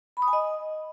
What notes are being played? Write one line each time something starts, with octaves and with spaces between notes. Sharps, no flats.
B5
D#6
G#5
D#5